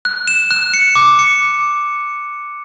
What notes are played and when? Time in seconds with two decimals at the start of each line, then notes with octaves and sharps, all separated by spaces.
0.05 F#6
0.27 E7
0.51 F#6
0.74 C#7
0.96 D6
1.19 C#7